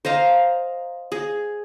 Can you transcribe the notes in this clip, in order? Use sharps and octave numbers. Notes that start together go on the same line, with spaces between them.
C5 D#5 F5 A#5
G#4